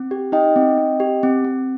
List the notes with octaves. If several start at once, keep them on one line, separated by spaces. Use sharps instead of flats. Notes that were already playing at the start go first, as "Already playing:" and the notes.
Already playing: C4
G4
D#4 D#5 G5
C4
C4
G4
C4
C4